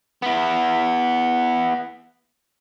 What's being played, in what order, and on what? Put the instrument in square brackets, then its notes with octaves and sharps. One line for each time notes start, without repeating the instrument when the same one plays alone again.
[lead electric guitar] B3 E4